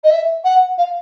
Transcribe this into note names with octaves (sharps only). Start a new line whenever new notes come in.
D#5
E5
F#5
F5